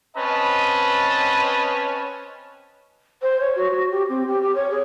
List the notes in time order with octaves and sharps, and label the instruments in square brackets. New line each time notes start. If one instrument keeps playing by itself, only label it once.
[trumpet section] C4 C#4 B4 D#5 A5
[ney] C5
C#5
F#4
F#4
G4
C4
G4
G4
C#5
G#4